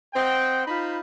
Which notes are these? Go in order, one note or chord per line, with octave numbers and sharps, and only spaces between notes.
C4 D#5 F#5 G5
D#4 F4 C5 B5